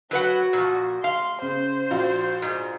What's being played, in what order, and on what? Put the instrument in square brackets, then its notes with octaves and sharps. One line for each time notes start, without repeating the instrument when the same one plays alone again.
[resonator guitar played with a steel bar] F#3 B4 F#5 [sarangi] F#4
[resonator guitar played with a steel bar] A#2 F3
[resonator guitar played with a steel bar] F5 [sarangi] C6
[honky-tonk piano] C#3 [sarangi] C5
[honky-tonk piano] A#1 F4 F#4
[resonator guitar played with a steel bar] G#2